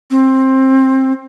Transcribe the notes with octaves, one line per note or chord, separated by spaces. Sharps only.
C4